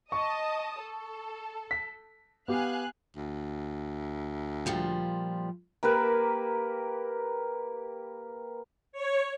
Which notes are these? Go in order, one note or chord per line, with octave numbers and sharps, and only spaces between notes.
D#5 A5 C#6 D#6
A4
B6
B3 G4 F5 G#5 F#6
D2
A#2 F3 G3
A#3 G4 A#4 B4
C#5